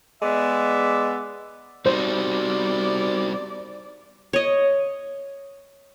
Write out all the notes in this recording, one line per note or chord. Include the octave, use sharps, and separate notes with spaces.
G#3 B3 D5 E5
G3 C4 D#4 F#4 C5 D5
C#5 D#5